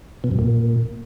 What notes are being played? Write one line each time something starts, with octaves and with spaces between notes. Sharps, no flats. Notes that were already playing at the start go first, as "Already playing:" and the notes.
B2
F#2
A#2